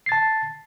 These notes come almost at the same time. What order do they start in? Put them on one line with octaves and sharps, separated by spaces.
C7 A6 A5